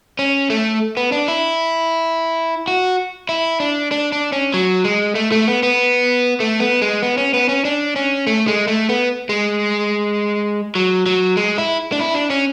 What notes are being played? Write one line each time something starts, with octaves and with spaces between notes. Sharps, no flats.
C#4
A3
B3
D4
E4
F#4
E4
D4
D4
D4
C#4
F#3
G#3
A3
A3
B3
B3
A3
B3
G#3
B3
C#4
B3
C#4
D4
C#4
A3
G#3
A3
B3
G#3
F#3
F#3
G#3
E4
D4
E4
D4
C#4